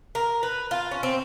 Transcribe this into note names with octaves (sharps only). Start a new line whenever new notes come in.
A#4
B4
F4
C#4
C4